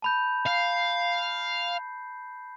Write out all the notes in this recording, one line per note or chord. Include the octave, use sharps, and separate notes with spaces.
A5 B5 G6
F5 C7